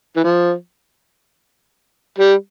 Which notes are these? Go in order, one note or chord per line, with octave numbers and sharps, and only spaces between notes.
E3
F3
G3